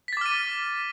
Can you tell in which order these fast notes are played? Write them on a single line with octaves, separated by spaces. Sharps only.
B6 A6 D6 F6 D#7